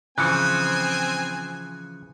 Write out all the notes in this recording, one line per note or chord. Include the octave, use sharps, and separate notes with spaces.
C#3 E3 F3 C4 G#5 F#6 C#7